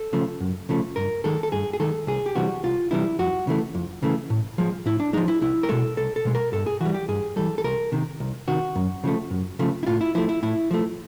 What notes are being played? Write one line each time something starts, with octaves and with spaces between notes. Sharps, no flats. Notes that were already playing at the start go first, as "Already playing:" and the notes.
Already playing: A4
C#3 F3 A3
F#2
C#3 F3 A3
G2 A#4
D#3 G#3 A4
A4
G2 G#4
G#4
D#3 G#3 A4
C2 G#4
G4
C3 E3 G3 F#4
C2 F4
C3 E3 G3 E4
F2 F#4
C#3 E3 A3
F2
C#3 E3 A3
A2
F3 G#3
A2 E4
D4
F3 G#3 D#4
E4
C2 E4
A#4
B2 G#3 A4
C2 A4
A4
B2 G#3
A#4
G2 A4
G#4
E3 G3 F#4
G4
G2 G#4
E3 G3 A4
A4
C2 A#4
C3 D#3
C2
C3 D#3 F#4
F#2
C#3 F3 A3
F#2
C#3 F3 A3
E4
A2 F4
E4
F3 A3 E4
E4
A2 E4
F3 A3